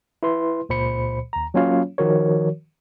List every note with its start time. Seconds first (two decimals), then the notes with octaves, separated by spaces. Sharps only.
0.23 E4 B4 C6
0.69 C#2 A#2 C5 B5 C#7
1.33 D#2 A#5
1.54 F#3 A#3 C#4 F4 C#5 F5
1.98 D#3 F3 F#4 A#4 C#5